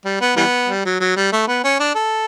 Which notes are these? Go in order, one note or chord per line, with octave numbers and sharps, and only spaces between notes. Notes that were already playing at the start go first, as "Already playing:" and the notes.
G3
B3
E3 G3 B3
G3
F#3
F#3
G3
A3
B3
C#4
D4
A4